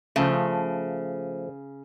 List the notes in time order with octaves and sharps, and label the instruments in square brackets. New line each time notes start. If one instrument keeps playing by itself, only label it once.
[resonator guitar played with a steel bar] C#3 [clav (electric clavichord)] F3 A3